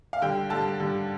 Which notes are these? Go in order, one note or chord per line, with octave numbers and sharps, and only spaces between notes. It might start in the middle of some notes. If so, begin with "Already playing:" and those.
F5
D3 G3 G5
D3 G3 A5
D3 G3